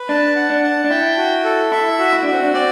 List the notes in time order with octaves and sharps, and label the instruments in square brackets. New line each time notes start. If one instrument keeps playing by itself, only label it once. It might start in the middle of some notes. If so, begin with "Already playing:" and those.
Already playing: [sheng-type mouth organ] B4
[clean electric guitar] D4 [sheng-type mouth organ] A5
[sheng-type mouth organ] F#5
[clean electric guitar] D4
[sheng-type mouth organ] A5
[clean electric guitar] D4
[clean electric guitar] E4 [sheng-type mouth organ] G5
[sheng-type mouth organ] F#4
A4
[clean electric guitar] E4 [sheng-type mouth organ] E5
[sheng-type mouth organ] F#4
[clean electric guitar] E4
[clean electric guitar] D4 [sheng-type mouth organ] F#4
[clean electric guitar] C4
D4
[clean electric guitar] C4 [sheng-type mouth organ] D5